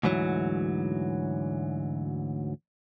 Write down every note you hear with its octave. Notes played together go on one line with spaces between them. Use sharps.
D2 G#2 E3 F#3